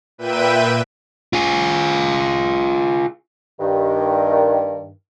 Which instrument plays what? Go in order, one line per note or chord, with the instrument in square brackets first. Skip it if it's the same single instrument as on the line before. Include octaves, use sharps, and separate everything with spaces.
[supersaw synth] A#2 B4 E5 G5 D#7
[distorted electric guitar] F4 G#4
[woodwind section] G2 D#3